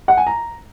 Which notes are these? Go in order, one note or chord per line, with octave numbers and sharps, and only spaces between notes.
F#5
G#5
A#5